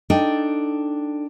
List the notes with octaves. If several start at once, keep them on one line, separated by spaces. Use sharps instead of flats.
D4 D#4 A4 G5